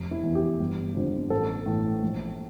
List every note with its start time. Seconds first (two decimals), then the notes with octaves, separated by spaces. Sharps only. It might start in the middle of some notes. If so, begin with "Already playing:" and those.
Already playing: F1
0.11 E4
0.23 E2 E3
0.35 G4
0.60 G1
0.95 F2 D3 F3
1.30 A1 A4
1.66 A2 E3
2.03 A#1